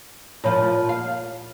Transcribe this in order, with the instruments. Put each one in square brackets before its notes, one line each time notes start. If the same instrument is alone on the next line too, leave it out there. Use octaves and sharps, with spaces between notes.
[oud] A#2 F3 [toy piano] E4 C#5 B5
[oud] F5